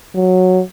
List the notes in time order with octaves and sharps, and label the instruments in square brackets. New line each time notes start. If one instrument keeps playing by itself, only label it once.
[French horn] F#3